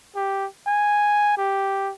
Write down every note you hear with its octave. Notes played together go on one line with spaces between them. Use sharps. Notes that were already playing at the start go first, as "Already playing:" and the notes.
G4
G#5
G4